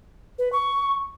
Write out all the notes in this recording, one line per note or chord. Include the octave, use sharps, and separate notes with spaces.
B4
C#6